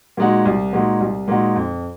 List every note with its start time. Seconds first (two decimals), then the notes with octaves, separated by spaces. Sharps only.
0.17 A#2 G#3 D#4 F#4
0.45 C2
0.73 A#2 G#3 D#4 F#4
1.00 C2
1.28 A#2 G#3 D#4 F#4
1.56 F2